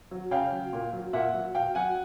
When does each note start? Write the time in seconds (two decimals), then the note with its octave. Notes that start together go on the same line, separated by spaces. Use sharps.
0.11 F#3
0.31 C#3 F5 G5
0.52 F#3
0.73 A#2
0.93 F#3
1.13 A#2 E5 F#5
1.34 F#3
1.55 B2 F5 G5
1.75 F#3 F#5 G#5